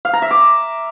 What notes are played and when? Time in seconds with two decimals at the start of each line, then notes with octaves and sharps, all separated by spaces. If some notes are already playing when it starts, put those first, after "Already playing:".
0.05 F5
0.13 A#5
0.22 E5
0.31 D6